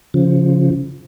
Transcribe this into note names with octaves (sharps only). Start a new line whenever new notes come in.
C#3 F3